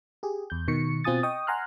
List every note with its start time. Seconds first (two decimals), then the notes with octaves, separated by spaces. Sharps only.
0.23 G4 G#4
0.50 E2 G6
0.68 B2 D#3 C#6 C#7
1.04 B2 C4 F4 G#5 D#6 A6
1.23 D#5 G5 C#6 D#6
1.47 F#5 G#5 A#5 C6 F6 F#6